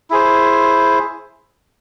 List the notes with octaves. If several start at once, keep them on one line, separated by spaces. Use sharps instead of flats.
E4 G#4 C5